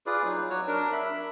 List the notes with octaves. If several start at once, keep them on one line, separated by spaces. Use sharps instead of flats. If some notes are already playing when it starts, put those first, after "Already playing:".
F4 G#4 B4 D5
F#3 D#4
F#3 F#4 C#5
D4 A#4
E5 B5